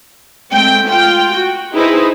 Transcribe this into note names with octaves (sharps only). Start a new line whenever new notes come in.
G#3 A3 C4 G5
F4 G5
F#4
D#4 E4 G#4 B4 C5